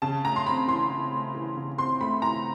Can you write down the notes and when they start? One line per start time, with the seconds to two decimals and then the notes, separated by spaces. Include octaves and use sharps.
0.02 C#3 A5
0.24 A3 A#5
0.36 C6
0.46 C4 B5
0.68 E3 C6
0.90 E3
1.12 A3
1.34 E3
1.57 C#3
1.78 C4 C6
2.00 A3 B5
2.22 E3 A#5